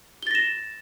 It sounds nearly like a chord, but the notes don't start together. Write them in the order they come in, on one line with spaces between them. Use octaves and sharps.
G7 A6 A#6 E7